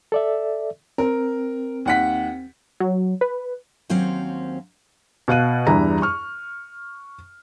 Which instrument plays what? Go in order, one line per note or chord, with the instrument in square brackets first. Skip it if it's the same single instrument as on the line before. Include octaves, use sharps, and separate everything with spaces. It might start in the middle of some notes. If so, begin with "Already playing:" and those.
[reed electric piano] A4 D5 E5
[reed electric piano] C4 [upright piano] A#4
[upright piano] D#2 F#5 B6
[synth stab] F#3
B4
[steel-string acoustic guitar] D#2 F#3 C4 C#4 C5 F5
[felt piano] B2 F5 F#6 D#7
E2 G2 E4 A#5
C#6 F6